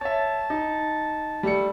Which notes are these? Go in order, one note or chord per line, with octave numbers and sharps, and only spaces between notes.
C#5 E5 A5
D#4
G3 A3 C#7